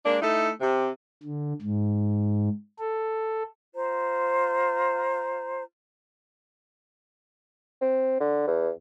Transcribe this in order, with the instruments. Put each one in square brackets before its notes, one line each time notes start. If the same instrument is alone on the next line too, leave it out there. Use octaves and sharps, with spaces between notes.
[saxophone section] G#3 A#3 D4
A3 D#4 E4 A4
C3
[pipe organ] D3
G#2
A4
[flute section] F4 C5 A#5
[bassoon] C4
D3
E2